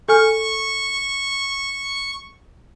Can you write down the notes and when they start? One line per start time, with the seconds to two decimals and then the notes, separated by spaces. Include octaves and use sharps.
0.09 A4 G#5 C#6 F6